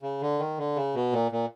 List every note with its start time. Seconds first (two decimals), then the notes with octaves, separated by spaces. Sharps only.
0.02 C#3
0.22 D3
0.39 D#3
0.58 D3
0.76 C#3
0.95 B2
1.13 A#2
1.32 A#2